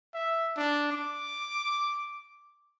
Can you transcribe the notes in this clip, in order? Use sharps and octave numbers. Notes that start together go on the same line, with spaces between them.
E5
D4
D6